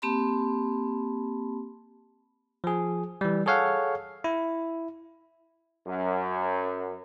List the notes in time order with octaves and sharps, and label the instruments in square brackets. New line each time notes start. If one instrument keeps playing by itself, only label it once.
[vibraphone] A#3 C4 G4 A5 B5 C6
[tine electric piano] F3 G#4
E3 G3
G#4 A4 C#5 F5 F#5
E4
[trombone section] F#2